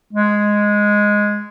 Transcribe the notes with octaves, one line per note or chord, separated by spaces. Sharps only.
G#3